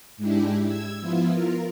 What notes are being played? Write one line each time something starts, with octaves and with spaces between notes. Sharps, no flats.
G#2 G#3 D4 E4 G4
E6 G#6
F3 B3 E4 F4
F4 A#4